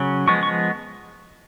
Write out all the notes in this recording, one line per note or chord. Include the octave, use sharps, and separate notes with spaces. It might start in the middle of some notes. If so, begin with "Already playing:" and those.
Already playing: C#3 F#3 C#4
F3 G#3 B3 C#6
C#6